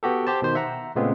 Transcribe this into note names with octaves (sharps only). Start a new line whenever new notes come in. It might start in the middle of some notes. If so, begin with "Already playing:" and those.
B3 F#4 G4 A4
G4 C5 A5
B2 D#3 C5
E5 F#5 A#5
A#2 C#3 G#3 A3 B3 C4